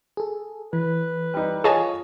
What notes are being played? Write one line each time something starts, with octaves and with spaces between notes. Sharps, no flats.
G#4 A4
E3 B4
G3 D#4
F4 G#4 C#5 D#5 G#5 A5